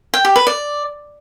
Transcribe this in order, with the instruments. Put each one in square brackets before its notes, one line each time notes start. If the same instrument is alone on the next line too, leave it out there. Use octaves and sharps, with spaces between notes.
[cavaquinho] G5
G4
B4
D5